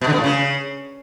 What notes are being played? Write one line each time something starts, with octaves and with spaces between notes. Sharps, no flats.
B2
D3
B2
A2
C#3